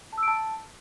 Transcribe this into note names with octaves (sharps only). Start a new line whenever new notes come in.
A5
E6
D7
A5